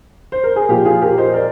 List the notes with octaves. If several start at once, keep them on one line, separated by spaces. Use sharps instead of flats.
C5
A#4
G#4
A#2 F3 A#3 G4
F4 G#4
G4 A#4
C5 D#5
A#4 D5